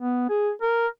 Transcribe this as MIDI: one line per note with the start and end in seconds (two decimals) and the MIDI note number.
0.01 0.29 59
0.29 0.51 68
0.62 0.87 70